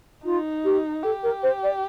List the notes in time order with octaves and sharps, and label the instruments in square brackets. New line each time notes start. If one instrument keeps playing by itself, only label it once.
[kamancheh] D#4 [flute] F4
[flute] G4
[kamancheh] G4 [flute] A4
[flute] A#4
C5
D5